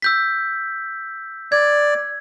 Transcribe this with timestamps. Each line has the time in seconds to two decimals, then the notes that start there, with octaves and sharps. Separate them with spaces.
0.02 E6 G6 B6
1.52 D5 G#6